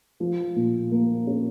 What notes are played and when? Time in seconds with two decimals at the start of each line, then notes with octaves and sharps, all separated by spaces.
0.20 F3
0.56 A#2
0.91 A#3
1.27 C#4